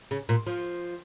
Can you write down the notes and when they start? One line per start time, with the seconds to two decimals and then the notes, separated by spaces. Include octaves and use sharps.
0.11 C#3
0.29 A#2
0.47 F3